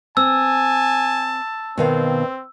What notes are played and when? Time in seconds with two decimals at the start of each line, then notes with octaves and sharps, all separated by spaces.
0.17 C4 G#5 A5 E6
1.78 B2 D#3 C4 F5